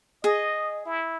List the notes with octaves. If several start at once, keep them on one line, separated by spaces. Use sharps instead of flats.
G#4 D#5
E4